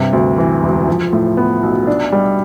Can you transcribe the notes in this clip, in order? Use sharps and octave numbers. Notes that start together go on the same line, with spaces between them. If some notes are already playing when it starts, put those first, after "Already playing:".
Already playing: G2 C3
D2
E3
E1
F3
A2
B3
B1
D4
G3